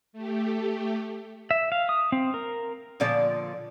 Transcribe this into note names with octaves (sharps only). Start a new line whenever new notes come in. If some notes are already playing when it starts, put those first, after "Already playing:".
A3 G4
E5
F5
D#6
C4
A#4
A#2 D3 F3 D5